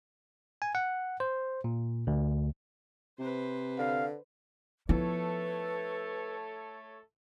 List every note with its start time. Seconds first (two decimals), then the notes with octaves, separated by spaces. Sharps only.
0.62 G#5
0.75 F#5
1.20 C5
1.64 A#2
2.07 D2
3.19 C3 B4 C5
3.79 D3 F5
4.89 F3 A3 B3 E4 A4 B4 C#5